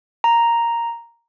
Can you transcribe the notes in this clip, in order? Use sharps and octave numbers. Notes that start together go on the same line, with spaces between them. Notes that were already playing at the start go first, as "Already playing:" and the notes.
A#5